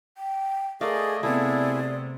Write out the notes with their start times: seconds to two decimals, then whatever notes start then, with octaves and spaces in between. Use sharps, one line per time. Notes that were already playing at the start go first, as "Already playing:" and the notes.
0.18 G5
0.81 A3 G#4 A#4 D5 D#5 F5
1.23 C3 A3 B3 E4 G#4 D5